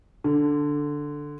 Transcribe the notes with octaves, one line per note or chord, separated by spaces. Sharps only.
D3